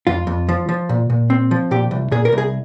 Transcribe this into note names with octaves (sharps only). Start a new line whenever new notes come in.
F2 F4
F2
F3
F3
A#2
A#2
C4
F3
A#2 G4
C2
A#2 G#4
A#4
C2
G#4